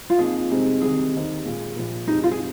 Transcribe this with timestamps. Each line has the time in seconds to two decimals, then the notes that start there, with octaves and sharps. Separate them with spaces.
0.10 F4
0.18 F2 F3 A#3 D#4 G#4
0.51 C2 C3 G#3 C4 D#4
0.82 C2 C3 D#3 G#4
1.13 D#2 D#3 C4 D#4
1.44 A#2 G#3 F4
1.76 A#1 A#2 F3 A#3
2.07 F1 F2 C3 G#3 D#4
2.23 F4
2.32 G#4